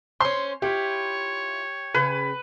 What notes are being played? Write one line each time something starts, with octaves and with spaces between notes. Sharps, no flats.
C#4 C5 C6
E4 F4 G4 C#5
C#3 B4